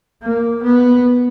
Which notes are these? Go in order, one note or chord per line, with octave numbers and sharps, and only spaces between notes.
A#3
B3